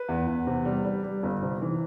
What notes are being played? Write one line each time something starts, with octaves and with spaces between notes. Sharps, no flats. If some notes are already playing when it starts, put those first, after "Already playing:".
Already playing: B4
E2
E2
C3
G3
G3
G3
G1
C3
E3